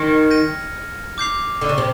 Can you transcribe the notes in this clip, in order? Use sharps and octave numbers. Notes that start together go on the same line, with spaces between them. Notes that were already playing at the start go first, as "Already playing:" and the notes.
Already playing: D#3 F6 G#6 C#7
G6 A#6 D#7
D6 G6 C7 F7
D3
C#3
C3